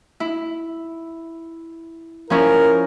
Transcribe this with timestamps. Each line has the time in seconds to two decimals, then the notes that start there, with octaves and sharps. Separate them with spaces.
0.20 E4
2.30 F3 C#4 E4 A#4